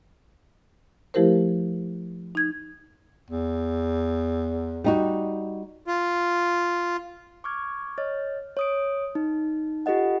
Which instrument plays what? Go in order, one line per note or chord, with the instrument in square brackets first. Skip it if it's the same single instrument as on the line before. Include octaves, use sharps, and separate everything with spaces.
[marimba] F3 A3 E4 G4 A#4 C5
D#4 G#6
[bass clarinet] E2
[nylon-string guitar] G3 D#4 F#4
[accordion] F4
[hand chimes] C#6 D6 F6 G#6
C#5 D#5 F6 A6
C#5 D#6 D7
D#4
F4 G4 A4 D#5 F#5